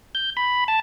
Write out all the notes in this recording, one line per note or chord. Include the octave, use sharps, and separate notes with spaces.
G6
B5
A5